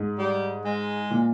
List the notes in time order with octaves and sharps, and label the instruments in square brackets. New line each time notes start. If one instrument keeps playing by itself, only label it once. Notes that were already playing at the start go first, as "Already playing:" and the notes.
Already playing: [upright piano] G#2
[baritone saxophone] G3
G#3
[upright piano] A#2